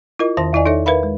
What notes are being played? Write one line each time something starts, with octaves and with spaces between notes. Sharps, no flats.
E4 F4 A#4 D#5
E2 D#3 C5 A5 C6 A#6
E2 E4 D5 D#5 G#5
D#4 A4 C#5 E5
A#4 B4 E5 F5 B5
G#3